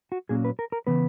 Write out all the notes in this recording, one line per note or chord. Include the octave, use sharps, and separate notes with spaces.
F#4
A#2 F#3 A#3 C#4 G#4
B4
A#4
A#4
C#3 E3 B3 B4